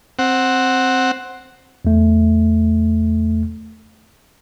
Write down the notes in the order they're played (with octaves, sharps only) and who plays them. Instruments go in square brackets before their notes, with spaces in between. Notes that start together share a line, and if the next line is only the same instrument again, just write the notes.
[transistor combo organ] C4 F#5
[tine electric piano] E2 A3